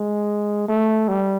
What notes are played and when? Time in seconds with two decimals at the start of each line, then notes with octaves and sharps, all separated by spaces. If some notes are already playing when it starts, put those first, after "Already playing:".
Already playing: G#3
0.68 A3
1.08 G3